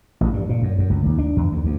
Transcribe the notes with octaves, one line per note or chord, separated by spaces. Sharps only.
A1
G2
A#2
F#2
F#2
C#2
D#2
D4
E2
D2
D2